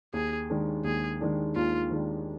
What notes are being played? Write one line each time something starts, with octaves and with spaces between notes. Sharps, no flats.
D#2 G#4
D#3 G#3 D4
D#2 G#4
D#3 G#3 D4
D#2 F4
D#3 G#3 D4